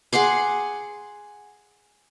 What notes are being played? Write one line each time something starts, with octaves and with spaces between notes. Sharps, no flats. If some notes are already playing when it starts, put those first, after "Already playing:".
G#4 F#5 C6 D6